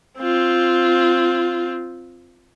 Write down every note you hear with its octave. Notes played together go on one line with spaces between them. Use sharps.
C4 F4